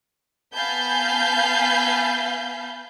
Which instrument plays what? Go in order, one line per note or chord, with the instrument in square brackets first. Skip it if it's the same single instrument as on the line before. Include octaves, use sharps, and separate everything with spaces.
[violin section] B3 F5 G#5 A5 B5 G6